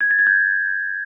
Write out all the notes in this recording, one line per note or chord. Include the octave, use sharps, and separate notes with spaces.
G#6
A6
G#6
G6